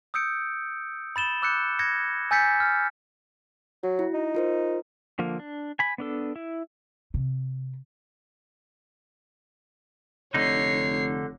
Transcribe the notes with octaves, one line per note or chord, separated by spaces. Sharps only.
D#6 E6 G6 C#7 D7
B5 A6 E7 G7
D6 E6 F#6 G6 C#7
G#6 A#6 C#7
G#5 E6 G6 A6 B6 C#7
F6
F#3 F#4
E4
D#4
F4 A#4 C5
D3 F3 A#3
D4
G#5 B5
B3 D4 A4
E4
C3
F1 D3 D#4 C#5 C7